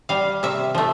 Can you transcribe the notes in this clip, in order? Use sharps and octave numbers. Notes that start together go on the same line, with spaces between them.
G3 F5
C3 E5
F3 A3